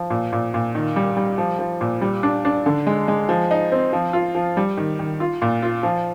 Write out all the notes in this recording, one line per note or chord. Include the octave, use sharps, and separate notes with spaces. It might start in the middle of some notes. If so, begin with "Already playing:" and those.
Already playing: F3
A#2
A#2
A#2
D#3
G3
G3
F3
F3
A#2
G3
D4
D4
D3
G#3
G#3
F3
D#4
C4
F3
F4
F3
G3
D#3
D#3
F4
A#2
F4
F3